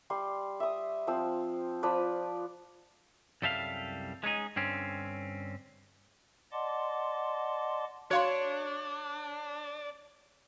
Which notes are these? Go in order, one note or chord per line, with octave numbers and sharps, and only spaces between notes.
G3 C6
E5 D#6
F3 C4 E6
F3 B4 D5
C2 F#2 G3 A4 E5 F5
G#3 C#4 D#4 G#4
G2 D3 C4 C#4
D5 D#5 F#5 A5 C6 D6
D4 F#4 C#5 F5 C6